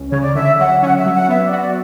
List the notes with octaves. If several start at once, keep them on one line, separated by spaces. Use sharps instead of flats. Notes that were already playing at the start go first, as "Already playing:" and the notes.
Already playing: C#2 C#4
C#3 C#5
D5
D3 E5
F#3 F#5
C#4 F#5
E5
F#3
F#5
B3 E5
D5
F#4
D5